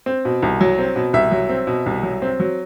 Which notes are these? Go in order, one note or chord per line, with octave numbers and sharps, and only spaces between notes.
C4
B2
C2
F#3
C4
B2
C2 E5
F#3
C4
B2
C2
F#3
C4
F#3